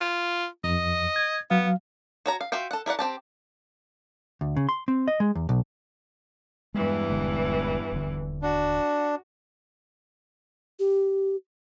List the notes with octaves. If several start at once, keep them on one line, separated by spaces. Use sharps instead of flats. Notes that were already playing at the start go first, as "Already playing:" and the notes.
F4
F2 D#5
G#6
F#3 B3 F5
F#4 C#5 A#5
F5
F4 F#4 E5 F5 G5
A4 F#5
E4 A#4 D5 F#5
C4 G4 A5
D2
C#3
C6
C4
D#5
G#3
E2
B1
E2 G2 E3 G#3
D#1 D3 G#3
D#1 D3
D4 F#4
G4